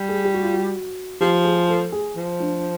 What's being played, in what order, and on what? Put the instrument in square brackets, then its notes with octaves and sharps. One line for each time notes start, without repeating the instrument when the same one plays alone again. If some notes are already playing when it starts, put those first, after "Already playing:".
Already playing: [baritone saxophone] G3
[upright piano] G#4
G4
F#4
F4
F#4
[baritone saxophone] F3 [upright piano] G4
[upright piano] G#4
A4
G#4
[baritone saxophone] F3
[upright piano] D4